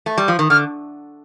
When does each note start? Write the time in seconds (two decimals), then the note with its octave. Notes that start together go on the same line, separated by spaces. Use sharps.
0.06 A3
0.18 G3
0.28 F3
0.39 D#3
0.50 D3 F6